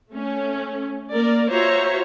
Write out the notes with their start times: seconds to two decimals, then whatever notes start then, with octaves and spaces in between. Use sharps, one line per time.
0.11 A3 C#4
1.12 A#3 A#4 D5
1.50 F4 F#4 C5 C#5 E5 A#5